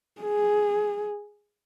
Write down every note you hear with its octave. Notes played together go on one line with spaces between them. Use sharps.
G#4